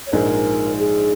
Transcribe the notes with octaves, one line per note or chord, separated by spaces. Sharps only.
C#5
A#1 G#2 F3 G#3 A#4
G#4